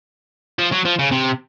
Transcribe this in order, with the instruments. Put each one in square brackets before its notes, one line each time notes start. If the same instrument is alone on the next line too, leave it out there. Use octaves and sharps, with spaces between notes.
[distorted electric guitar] F3
F#3
F3
C#3
C3